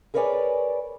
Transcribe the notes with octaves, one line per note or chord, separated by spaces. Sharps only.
G#4 A#4 B4 C#5 D5 G#5